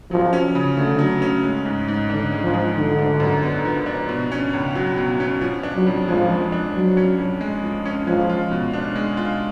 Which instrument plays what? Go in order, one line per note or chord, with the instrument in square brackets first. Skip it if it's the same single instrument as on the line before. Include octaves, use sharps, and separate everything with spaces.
[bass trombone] F3 [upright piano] F#3
[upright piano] C#4
C#3
[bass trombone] D3 [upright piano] A3
[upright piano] F#3
C#4
G#3
G#2
G#2
[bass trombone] D3 [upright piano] D4
[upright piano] G#3
[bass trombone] F3
[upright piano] G#2
[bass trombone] D3 [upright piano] F3
[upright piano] D4
F#2
B3
F3
D4
B2
C#4
C#2
F#3
B2
C#4
F3
D4
[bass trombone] F#3
[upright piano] F2
[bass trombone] F3 [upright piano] G#3
[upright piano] F3
D4
[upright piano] F3 [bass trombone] F#3
[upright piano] C#4
F2
G#3
F3
C#4
[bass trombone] F3 [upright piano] G#3
[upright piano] F4
B2
D4
G#3
F4